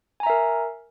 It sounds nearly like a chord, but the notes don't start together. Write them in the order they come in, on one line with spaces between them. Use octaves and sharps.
G#5 A#5 E5 A#4